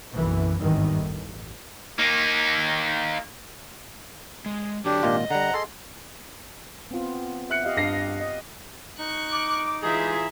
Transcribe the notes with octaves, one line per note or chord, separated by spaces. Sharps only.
F#1 B1 F#2 E3
G#1 E2 G2 D#3 E3
A1
A#3 D#4
G#3
D3 F#3 D4 G4
G#1 A#2 F4 D#5
D3 G3 F#5 A#5
G#4 A4 C6
B3 C4 F4
E5 F#6 C#7
G4 D#5 F5
G2 A#6 C7
D#5
D#4 C#6 F#6
D6
E3 G#3 E4 F4 G4 G#4 A#5